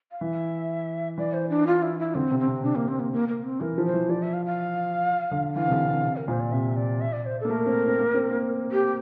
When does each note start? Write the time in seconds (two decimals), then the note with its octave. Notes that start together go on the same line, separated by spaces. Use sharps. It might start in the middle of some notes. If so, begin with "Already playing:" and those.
0.11 F5
0.21 E3 E5
1.18 E3 D5
1.34 C5
1.50 D4
1.67 F4
1.82 E4
1.99 E4
2.15 D3 C4
2.31 C3
2.39 C4
2.47 C3
2.64 C3 D4
2.75 A#3
2.88 C4
3.00 A#3
3.13 A#3
3.28 A#3
3.44 C4
3.61 E3 A#4
3.78 F3
3.85 C5
3.94 E3
4.09 F3 D5
4.22 E5
4.33 F5
4.45 F5
5.31 D3
5.55 E3 F5
5.67 C3
5.72 D3
5.87 C3
6.04 C3
6.16 A#4
6.28 A#2 C5
6.40 D5
6.52 C3 E5
6.76 D5
7.01 E5
7.13 D5
7.26 C5
7.41 A4
7.45 A#3
7.50 A3 A#4
7.66 C4
7.87 C4
7.99 A#3
8.14 C4
8.31 A#3
8.72 G4